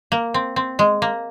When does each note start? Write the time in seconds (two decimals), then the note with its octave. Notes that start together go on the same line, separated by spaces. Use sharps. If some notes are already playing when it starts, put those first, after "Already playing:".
0.12 A#3
0.34 C4
0.56 C4
0.79 G#3
1.02 A#3